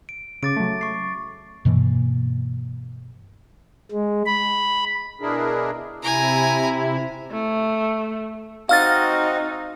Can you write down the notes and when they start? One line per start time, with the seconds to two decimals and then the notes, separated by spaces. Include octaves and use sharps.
0.09 D7
0.43 C#3 D6 A6 D7
0.57 F#3 A3
0.81 C#6 C7
1.65 G2 B2 E3 A#3
3.92 G#3
4.26 B5
5.21 B2 D4 E4 G#4 A#4
6.02 C3 E4 G#5 A#5
7.31 A3
8.69 C4 D#4 F#4 D#5 F5 F6 A6